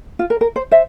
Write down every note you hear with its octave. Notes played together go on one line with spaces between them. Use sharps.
F4
A#4
A#4
C5
C5 E5